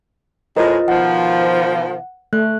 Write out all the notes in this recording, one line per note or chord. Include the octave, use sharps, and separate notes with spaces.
A2 G#3 F4 A#4 C5 D#5
B2 D#3 F3 F#5
A3 F#6